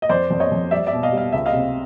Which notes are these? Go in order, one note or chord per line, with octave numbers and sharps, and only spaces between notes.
D#5
F2 C5 D5
F2 D5
C#5 D#5
F2
G3 D5 E5
D5 E5
B2
D#5 F5
G3
F5
C#2 E5
D#5 F5
C3